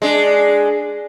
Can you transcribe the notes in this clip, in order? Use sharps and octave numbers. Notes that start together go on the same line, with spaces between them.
G#3 D4